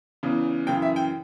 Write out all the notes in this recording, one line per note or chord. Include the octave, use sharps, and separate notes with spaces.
E2 C#3 E3
F#2 C#3 E3 G5
E5
G5